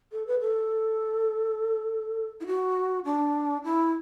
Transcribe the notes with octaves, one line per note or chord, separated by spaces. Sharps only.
A4
B4
A4
E4
F#4
D4
E4